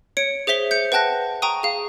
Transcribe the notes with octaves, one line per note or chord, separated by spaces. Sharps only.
C#5 C#7 D7
G#4 C5 E5 B6 G7
G6 C#7
B4 F#5 G5 A5 F#6 A#6
G5 A#5 C#6 D#6 D#7
G#4 F5